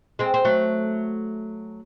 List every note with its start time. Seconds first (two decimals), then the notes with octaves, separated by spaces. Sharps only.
0.19 G#3 C4
0.34 C4
0.45 F#3 A3